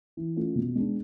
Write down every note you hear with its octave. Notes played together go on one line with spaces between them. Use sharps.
E3
A3 C#4 F4
B2
G#3 B3 D4